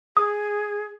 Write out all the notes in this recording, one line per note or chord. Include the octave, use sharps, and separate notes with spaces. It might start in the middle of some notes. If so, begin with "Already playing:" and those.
G#4 D#6